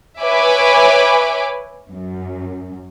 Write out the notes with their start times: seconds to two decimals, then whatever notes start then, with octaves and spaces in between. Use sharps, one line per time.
0.22 B4 C#5 E5 G#5 B5 D6
1.91 F#2